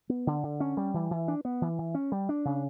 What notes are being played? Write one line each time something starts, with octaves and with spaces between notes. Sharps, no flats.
B3
D3
D3
C#4
G3
E3
E3
D4
B3
E3
E3
C#4
G3
D4
C#3